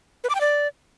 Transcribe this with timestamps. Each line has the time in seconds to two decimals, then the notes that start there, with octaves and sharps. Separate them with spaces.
0.24 B4
0.30 D6
0.35 G5
0.41 D5